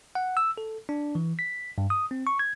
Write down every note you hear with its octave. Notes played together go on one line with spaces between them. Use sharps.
F#5
E6
A4
D4
E3
B6
G2
D#6
C4
C#6
G#6